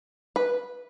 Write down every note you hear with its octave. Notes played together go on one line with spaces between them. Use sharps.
B4